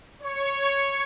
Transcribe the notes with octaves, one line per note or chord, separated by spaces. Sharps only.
C#5